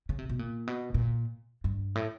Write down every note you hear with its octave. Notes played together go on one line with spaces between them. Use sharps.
C#3
C3
B2
A#2
B2
A#2
G2
A2